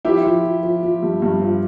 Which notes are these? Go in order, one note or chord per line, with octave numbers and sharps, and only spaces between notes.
F3 E4 G4
F3
F3
F3
F3
G2
G2
F3